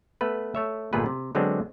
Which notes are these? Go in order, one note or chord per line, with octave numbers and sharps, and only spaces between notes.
A3 B3 B4
A3 C#5 E5
G1 A#2 A3 B3 G#4 B4
C3
D3 F#3 G#3 B3 C4 D4